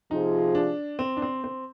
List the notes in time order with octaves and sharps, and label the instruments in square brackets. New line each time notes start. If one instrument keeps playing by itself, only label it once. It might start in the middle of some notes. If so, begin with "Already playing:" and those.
[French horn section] C3 F3 C4 F4 G#4 [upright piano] D#4
[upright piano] D4
C4
D4
C4
C4